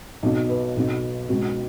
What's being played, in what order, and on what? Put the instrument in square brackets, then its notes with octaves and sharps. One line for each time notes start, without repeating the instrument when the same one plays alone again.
[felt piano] B1 B2
B4
B1 B2
C#2 B2 F#4